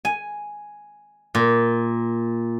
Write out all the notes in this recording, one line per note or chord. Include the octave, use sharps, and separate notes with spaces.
G#5
A#2